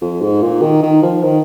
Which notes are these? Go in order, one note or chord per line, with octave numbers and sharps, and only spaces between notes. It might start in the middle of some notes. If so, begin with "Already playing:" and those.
F2
G#2
A#2
D#3
D#3
F3
D#3